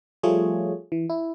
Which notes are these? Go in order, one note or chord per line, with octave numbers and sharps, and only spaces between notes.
F3 G3 A3 F4 G#4 C#5
E3
E4